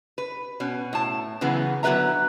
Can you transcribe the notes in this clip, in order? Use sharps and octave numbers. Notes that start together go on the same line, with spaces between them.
B4
B2 C#4
A2 A5
C#3 E3 F#3 B3
D3 F#3 B3 B4 E5 A#5